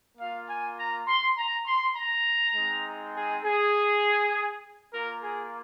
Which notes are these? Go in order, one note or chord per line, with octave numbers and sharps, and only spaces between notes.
A#3 F4 F5
G#5
A#5
C6
A#5
C6
A#5
G#3 C4 D#4
G#4
G#4
A#3 F4 A#4
G#4